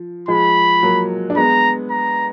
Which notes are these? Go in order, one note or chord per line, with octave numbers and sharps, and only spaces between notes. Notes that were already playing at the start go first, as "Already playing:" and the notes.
Already playing: F3
F3 G#3 B5
F#3 A#3
D4
G#3 B3 A#5
A#5